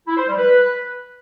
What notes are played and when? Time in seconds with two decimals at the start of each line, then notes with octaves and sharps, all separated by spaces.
0.07 E4
0.18 C5
0.28 G3
0.39 B4